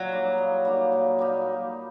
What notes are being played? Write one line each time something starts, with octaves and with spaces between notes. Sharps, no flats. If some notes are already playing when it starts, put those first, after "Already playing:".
Already playing: A#2 F#3
G3 A#3 D#4
A#2
G3 A#3 D#4
A#2
G3 A#3 D#4